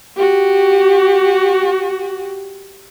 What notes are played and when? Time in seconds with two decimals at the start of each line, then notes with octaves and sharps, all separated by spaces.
0.16 F#4 G4